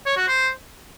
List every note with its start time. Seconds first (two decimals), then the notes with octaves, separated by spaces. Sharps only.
0.06 C#5
0.17 F#4
0.28 C5